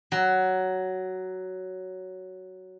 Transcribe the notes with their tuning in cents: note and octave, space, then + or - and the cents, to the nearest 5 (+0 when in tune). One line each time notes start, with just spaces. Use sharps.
F#3 +10